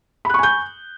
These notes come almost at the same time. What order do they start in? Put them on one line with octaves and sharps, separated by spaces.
B5 F#6 C#6 G#5 G6